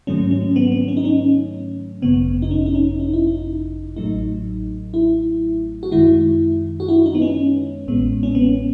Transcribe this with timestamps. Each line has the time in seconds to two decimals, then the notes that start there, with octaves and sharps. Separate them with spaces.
0.07 G#2 D#3 F#3 A3 C#4
0.31 C#4
0.56 B3
0.72 B3
0.88 C#4
0.97 D#4
1.05 C#4
2.02 G#1 F#2 C#3 B3
2.42 D#4
2.51 C#4
2.66 D#4
2.75 C#4
2.99 D#4
3.13 E4
3.27 D#4
3.96 A1 A2 F#3 A3 D#4
4.94 E4
5.83 F#4
5.91 F#2 D#3 G#3 E4
6.80 F#4
6.88 E4
7.06 D#4
7.15 B3
7.22 C#4
7.87 A1 A2 G#3 B3
8.23 C#4
8.35 B3